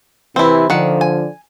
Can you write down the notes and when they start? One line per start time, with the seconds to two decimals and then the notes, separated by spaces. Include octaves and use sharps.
0.36 C3 E3 C4 E4
0.70 D3 D#3 F3 F#5
1.01 G#5